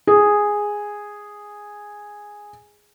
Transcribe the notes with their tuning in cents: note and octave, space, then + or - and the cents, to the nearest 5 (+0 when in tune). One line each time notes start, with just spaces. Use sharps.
G#4 -5